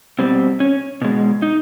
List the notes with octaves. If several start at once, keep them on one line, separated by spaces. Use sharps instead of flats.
B2 G3 C4
C#4
B2 G#3
D#4